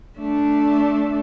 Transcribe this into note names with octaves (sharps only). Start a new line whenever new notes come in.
A3 D4